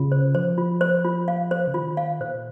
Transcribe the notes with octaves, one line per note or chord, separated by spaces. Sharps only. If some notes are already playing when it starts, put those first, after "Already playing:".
Already playing: C#3 F4
C5
F3 C5
F4
C5
F4
F5
C5
C#3
D#3 F4
F5
A#2 C5